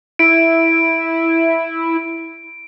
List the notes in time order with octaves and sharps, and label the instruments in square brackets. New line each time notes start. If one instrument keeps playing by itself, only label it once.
[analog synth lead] E4 [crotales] D7